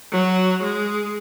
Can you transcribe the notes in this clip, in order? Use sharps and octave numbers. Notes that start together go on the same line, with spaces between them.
F#3
G#3